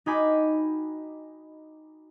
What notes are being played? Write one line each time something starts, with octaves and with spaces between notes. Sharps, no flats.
D#4 F#4 G5 G#5 B5 D6